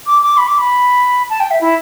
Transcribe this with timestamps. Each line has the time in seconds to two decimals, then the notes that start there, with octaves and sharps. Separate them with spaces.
0.07 D6
0.22 D6
0.37 B5
0.48 D6
0.58 B5
1.30 A5
1.40 G5
1.51 E5
1.61 E4